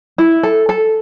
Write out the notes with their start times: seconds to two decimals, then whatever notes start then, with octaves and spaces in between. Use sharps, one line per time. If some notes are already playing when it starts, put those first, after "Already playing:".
0.18 E4
0.43 A4
0.69 A4